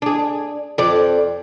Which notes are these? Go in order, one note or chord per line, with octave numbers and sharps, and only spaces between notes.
D4 G#4
F2 D5